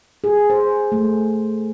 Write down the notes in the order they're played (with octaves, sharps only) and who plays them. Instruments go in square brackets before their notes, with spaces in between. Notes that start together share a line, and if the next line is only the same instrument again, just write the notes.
[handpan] G#4
C5
A3